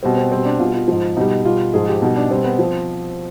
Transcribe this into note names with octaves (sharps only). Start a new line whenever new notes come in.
B2 G3 C4
C4
B2 G3 C4
D4
B2 G3 F4
F4
G#2 F3
B2 G3 D#4
B2 G3 F4
G#2 F3 G#4
G4
B2 G3 D#4
D4
B2 G3 C4
B3
F3 C4